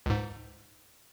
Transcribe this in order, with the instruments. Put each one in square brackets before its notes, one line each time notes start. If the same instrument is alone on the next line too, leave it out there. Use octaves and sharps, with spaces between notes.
[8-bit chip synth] C#2 G#2